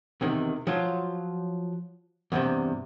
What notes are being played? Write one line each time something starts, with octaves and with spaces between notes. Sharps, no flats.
E2 C3 D#3
F3 F#3 F4
E2 G2 C3